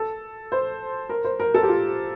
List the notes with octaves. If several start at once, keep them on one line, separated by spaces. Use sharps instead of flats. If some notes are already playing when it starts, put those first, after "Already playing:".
Already playing: A4
C5
A#4
C5
A#4
A4
G4
F4